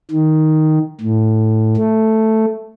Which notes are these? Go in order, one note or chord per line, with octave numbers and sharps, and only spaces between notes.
D#3
A2
A3